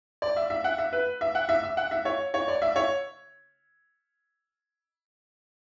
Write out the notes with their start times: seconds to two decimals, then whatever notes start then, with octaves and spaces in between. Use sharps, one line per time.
0.22 D5
0.36 E5
0.50 E5
0.64 F#5
0.78 E5
0.93 B4
1.21 E5
1.35 F#5
1.49 E5
1.63 E5
1.77 F#5
1.91 E5
2.05 C#5
2.34 C#5
2.48 D5
2.62 E5
2.76 C#5